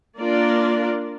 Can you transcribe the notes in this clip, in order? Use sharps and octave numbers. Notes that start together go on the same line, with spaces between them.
A#3 D4 F4 A#4 D5